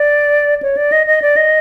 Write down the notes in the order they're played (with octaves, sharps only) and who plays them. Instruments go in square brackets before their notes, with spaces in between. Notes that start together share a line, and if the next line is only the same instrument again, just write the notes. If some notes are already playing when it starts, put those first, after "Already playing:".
Already playing: [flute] D5
C#5
D5
D#5
D#5
D5
D#5